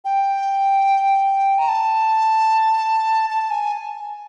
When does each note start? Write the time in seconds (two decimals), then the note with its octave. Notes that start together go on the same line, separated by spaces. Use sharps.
0.05 G5
1.59 A#5
1.68 A5
3.30 A5
3.51 G#5